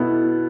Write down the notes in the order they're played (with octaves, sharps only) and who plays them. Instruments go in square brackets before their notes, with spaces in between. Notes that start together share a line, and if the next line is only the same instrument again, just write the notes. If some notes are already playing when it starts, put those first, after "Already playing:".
Already playing: [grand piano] B2 B3 E4 A4